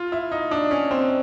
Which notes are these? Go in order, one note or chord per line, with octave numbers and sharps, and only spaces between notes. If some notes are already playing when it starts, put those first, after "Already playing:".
Already playing: F4
E4
D#4
D4
C#4
C4